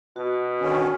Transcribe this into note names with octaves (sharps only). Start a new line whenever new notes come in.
B2 F#4
D3 D#3 C#4